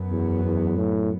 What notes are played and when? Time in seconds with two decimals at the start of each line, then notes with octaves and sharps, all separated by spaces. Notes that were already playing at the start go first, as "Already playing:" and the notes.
Already playing: F#2 F#3 B3
0.11 E2
0.44 E2
0.76 A2